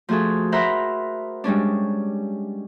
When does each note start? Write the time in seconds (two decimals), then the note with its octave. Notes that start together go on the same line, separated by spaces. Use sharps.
0.09 F3 A3 F#4 G#4 A4
0.52 A#4 C5 E5 F#5 A#5 B5
1.44 G3 G#3 C#4 D4